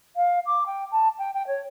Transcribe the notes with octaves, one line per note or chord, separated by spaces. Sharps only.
F5
D6
G5
A5
G5
G5
C#5